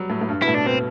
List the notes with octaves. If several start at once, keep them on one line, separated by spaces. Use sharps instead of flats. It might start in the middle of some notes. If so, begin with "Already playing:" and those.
Already playing: F#3 G3
A2
A2
G2
B2 E4
A2
D4
B2 C4